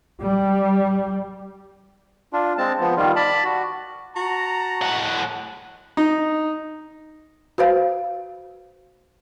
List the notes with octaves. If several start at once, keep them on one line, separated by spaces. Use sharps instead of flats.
G3
D4 F4
G#3 C4 A5
F3 B3
D#3 G3 F4
D5 A5 B5
F#4
F#4 A5 A#5
A2 F#5
D#4
F#4 B4 C5 F5